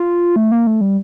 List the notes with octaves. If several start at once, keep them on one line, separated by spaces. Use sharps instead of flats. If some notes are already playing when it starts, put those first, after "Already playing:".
Already playing: F4
A3
A#3
A3
G3